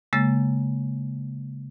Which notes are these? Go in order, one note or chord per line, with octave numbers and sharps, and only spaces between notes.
C#3 G#3 A#3 A6